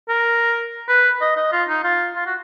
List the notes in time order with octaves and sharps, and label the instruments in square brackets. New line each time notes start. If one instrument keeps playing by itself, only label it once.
[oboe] A#4
B4
D#5
D#5
F4
D#4
F4
F4
F#4